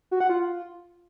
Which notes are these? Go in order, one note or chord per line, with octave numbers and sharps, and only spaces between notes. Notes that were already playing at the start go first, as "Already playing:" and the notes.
F#4
F#5
F4